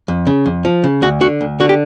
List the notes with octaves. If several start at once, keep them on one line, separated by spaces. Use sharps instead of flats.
F2
C#3
F2
F3
C#3
D2 F#4
D3 F#4
D2
D3 F#4
G4